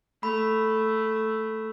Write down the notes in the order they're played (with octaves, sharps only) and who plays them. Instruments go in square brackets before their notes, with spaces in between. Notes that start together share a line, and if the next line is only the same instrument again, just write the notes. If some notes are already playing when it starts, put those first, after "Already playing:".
[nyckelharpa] A3 [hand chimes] B5